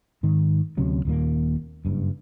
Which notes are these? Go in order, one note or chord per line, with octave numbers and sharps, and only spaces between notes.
G#2 D#3
D2 C3 F#3 C#4
D#1 D#2 A#2 A#3
F#1 G2